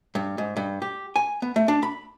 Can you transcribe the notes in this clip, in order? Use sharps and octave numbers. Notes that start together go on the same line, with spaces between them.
G2
G#2
G2
G4
G#5
B3
A3
D4
B5